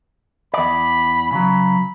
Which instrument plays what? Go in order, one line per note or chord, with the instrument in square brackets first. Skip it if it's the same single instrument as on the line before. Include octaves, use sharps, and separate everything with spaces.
[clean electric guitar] E2 D5 [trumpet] B5
[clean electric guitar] C#3 F#3 [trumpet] B5